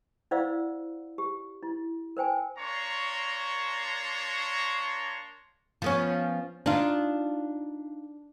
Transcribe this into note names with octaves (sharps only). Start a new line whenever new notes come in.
E4 C5 D5 F5 F#5 E6
G4
E4
A#4 C5 G5 G#5
A#3 D4 C#5 A#5 C6 C#6
F3 B3 C#4
D4 D#4 F4